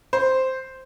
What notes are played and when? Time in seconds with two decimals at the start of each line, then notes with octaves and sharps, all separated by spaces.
0.13 C5